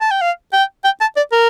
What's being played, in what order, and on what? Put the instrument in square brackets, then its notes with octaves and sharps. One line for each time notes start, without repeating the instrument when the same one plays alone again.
[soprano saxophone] A5
G5
F5
G5
G5
A5
D5
A#4